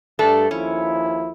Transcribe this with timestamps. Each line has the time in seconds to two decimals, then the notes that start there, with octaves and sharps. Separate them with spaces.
0.19 G2 A3 D4 A4
0.51 D#2 F3 C#4 E4